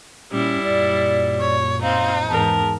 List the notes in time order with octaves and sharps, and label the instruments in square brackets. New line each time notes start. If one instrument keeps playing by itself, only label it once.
[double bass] A#2 [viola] G3 E4 [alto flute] C#4
[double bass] F#2 A#2 [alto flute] D5
[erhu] C#5
[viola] C4 F4 [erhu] D#4 [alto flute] F5
[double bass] E2 G#2 [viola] B3 A#4 [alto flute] A5